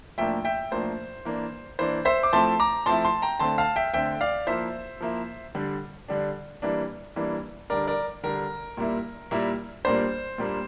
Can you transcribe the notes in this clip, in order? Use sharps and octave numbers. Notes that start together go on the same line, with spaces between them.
A2 F3 A#3 D4 E5 G5
E5 G5
A2 F3 A#3 D4 C5
E3 A#3 D4
E3 A#3 D4 C5
C5 E5
D6
F3 A3 C4 E4 A5 C6
A#5 D6
F3 A3 C4 E4 A5 C6
A5 C6
G5 A#5
D3 A3 C4 A5 C6
F5 A5
E5 G5
D3 A3 C4 E5 G5
D5 F5
F3 A#3 E4 C5 E5
F3 A#3 E4
D3 G3 D4
D3 G3 D4
E3 G3 A#3 D4
E3 G3 A#3 D4
D3 G3 D4 A#4 D5
A#4 D5
D3 G3 D4 A#4
A#2 G3 A#3 E4
A#2 G3 A#3 E4
A#2 G3 A#3 D4 C5
A#2 G3 A#3 D4